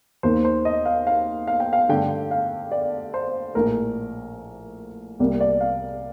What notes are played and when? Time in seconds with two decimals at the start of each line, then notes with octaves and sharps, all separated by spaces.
0.23 D#2 D#3 A#3 C5
0.45 C5
0.65 D#5
0.85 F5
1.07 F5
1.48 F5
1.60 G5
1.73 F5
1.89 G2 D3 A3 G5
2.31 F5
2.71 D5
3.14 C5
3.54 A#1 A2 A3 A#4
5.20 C2 C3 G3 A#3
5.40 D5
5.61 F5